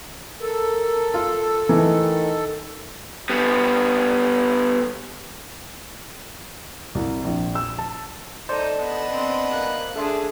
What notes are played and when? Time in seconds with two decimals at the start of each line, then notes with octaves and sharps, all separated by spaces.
0.41 A4 A#4
1.14 F4
1.69 D#3 E3 A3
3.30 G3 B3
6.95 C2
7.25 A#1
7.55 E6
7.79 A5
8.49 D#4 A4 C5 D5
8.79 B3 D4 D#5
9.09 C4
9.51 A#3 F#6
9.96 D4 G#4 A4 E5 C6